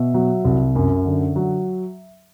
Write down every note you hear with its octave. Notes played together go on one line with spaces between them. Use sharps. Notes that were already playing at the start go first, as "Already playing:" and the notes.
Already playing: B2 E5
F#3
C2
F#2
D3
F#3